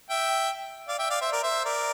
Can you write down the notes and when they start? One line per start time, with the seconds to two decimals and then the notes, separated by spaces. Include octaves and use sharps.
0.10 E5 G5
0.88 D5 F5
0.99 E5 G5
1.10 D5 F5
1.21 C5 E5
1.32 A#4 D5
1.43 C5 E5
1.65 A#4 D5